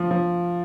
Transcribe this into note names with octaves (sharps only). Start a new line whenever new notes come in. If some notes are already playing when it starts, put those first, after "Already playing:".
Already playing: F3
F3